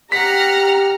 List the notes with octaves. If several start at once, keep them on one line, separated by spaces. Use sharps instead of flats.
G4 F#5 A#5 F6 B6